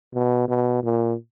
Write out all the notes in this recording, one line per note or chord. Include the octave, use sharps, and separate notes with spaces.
B2
B2
A#2